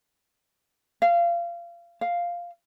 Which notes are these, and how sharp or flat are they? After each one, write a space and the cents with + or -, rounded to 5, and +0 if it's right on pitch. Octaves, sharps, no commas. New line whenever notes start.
F5 -25
F5 +0